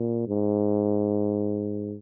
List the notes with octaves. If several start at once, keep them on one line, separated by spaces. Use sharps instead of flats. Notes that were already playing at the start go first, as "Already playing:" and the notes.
Already playing: A#2
G#2